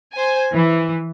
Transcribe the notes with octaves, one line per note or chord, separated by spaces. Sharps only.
C5 G#5
E3